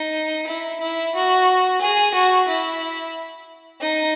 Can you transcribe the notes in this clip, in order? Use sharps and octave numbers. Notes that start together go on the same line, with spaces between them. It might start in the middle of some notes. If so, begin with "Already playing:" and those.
Already playing: D#4
E4
E4
F#4
G#4
F#4
E4
D#4